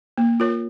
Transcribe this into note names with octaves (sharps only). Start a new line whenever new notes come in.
A#3
F4 A#4 C#5